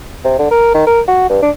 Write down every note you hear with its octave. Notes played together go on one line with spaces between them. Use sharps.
C3
D3
A#4
D#3
A#4
F#4
G2
D4